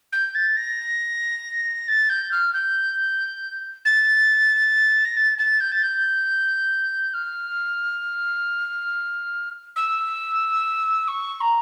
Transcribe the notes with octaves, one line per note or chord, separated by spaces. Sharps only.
G6
A6
A#6
A6
G6
F6
G6
A6
A#6
A6
A6
G6
A6
G6
F6
E6
C#6
A#5